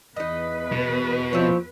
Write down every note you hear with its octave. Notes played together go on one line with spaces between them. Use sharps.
E2 D#4 B4 D#5
B2
F3 C4 E4 C#5